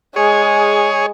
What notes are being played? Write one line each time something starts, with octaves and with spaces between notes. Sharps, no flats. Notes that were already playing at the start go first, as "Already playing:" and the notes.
G#3 G#4 C#5